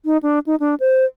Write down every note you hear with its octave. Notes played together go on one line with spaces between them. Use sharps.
D#4
D4
D#4
D4
C5